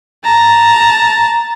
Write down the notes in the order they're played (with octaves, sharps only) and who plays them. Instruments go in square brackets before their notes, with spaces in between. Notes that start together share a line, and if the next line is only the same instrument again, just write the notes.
[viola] A5 A#5